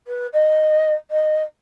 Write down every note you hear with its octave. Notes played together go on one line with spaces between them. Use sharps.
B4
D#5
D#5